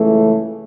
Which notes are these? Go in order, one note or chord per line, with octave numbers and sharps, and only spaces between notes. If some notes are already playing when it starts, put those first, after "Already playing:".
Already playing: C#2 C#3 E3 A3